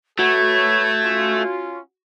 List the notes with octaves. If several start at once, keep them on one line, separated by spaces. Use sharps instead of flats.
A3 F#4 A4 B4 C#5 G#6
C#4 F4